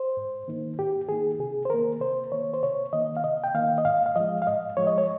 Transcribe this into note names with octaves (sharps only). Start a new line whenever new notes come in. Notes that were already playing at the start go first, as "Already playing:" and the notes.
Already playing: C5
G#2
D#3 A#3 D#4
G#2 G4
D#3 A#3 D#4 G#4
C3 G#4
C5
D#3 A#3 A#4
C3 C5
D#3 A#3 C#5
C5
C3 C#5
D#3 A#3 D#5
F5
C3 D#5
G5
D#3 A#3 F5
D#5
G#2 F5
F5
F3 G#3 D#5
F5
G#2 D#5
F3 G#3 C#5
D#5
C#5